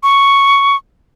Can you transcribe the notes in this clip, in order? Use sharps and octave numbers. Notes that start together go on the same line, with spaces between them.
C#6